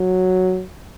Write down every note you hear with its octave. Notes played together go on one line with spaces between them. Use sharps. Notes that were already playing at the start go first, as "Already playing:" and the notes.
Already playing: F#3